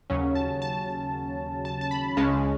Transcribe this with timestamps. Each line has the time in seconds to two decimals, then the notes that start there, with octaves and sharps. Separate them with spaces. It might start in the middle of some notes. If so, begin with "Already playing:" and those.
0.10 D#2 C#3 F#3 C#4
0.35 A5
0.62 A5
1.65 A5
1.81 A5
1.91 B5
2.17 C#2 C#3 G#3 C#4 A5